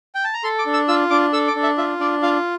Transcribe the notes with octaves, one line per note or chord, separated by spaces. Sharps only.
G5
A5
A#5
A4 C6
D6
D4
E6
F4 E6
D4 D6
A4 E6
D6
D4
E5
F4 E5
D4 D5
F4 F5